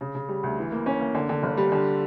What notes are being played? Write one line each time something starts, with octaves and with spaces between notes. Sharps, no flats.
C#3
C#3
G3
D2
E3
A#3
C#4
A#3
D3
D3
G1
G3
D3